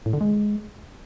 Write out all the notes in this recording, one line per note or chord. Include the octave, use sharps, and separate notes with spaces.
A2
D3
G#3